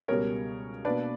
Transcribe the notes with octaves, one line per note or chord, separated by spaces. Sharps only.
C#2 B2 G3 A#4 C#5
B2 A#3 D4 B4 D5